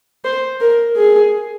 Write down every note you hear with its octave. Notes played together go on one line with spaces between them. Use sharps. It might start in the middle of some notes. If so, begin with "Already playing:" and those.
C5
A#4
G#4